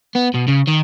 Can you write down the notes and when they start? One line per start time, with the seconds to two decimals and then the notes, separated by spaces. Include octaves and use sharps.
0.15 B3
0.34 B2
0.48 C#3
0.67 D#3